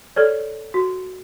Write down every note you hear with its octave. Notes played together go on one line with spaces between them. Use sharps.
A4 C#5 D5
F#4